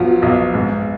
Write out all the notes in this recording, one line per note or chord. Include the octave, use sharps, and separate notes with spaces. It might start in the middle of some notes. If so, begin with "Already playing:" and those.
Already playing: B1 F3 F#3
B1
G#2